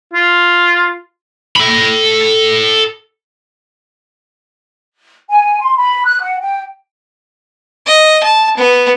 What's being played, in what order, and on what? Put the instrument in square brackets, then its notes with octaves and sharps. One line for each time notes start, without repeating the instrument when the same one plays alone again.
[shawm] F4
[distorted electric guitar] A4 B5
[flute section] G#5
C6
B5
F#6
F#5
G5
[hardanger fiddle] D#5
A5
B3